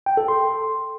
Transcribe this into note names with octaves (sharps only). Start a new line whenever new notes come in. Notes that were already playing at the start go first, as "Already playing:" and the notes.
G5
A4
C6